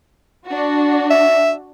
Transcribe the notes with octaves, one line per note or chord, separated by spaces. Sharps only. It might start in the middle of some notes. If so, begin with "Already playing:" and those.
D4 F#4
E5